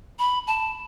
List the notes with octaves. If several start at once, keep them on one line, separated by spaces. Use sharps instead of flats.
B5
A5